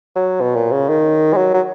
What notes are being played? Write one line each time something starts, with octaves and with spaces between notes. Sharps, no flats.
F#3
B2
A#2
C#3
D#3
G#3
F#3
F#3